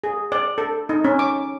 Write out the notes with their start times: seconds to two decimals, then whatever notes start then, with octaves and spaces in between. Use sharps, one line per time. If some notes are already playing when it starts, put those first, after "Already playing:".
0.04 G#4
0.32 D5
0.58 A4
0.89 D#4
1.04 C#4
1.19 D6